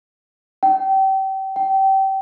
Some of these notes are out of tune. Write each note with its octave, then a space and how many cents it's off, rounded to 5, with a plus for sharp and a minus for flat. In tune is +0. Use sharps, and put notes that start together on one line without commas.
G5 -30
G5 -25